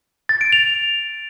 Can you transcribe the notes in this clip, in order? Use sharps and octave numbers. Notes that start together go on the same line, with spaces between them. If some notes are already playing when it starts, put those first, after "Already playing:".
A6
D7
F7